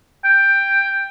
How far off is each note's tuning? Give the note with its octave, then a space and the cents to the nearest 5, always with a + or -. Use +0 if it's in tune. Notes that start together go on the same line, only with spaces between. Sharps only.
G5 +5